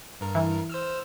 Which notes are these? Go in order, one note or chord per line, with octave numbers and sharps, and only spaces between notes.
G2 A#4
E3
C5 E6 F6